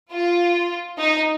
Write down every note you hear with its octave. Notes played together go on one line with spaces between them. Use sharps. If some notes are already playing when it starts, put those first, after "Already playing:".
F4
D#4